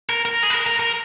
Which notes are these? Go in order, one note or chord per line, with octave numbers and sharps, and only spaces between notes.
A#4
A#4
G#4
B4
A#4
A#4
A#4